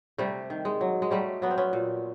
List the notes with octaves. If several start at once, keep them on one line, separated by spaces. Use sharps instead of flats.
C3 G3 A3
D#3
G#3
F#3
G#3
F#3 G3 A3
F#3 B3
C4
B3 C#4
A#2